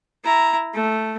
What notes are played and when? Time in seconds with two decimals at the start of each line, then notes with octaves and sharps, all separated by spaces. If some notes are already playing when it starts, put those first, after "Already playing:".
0.24 E4 A#5
0.73 A3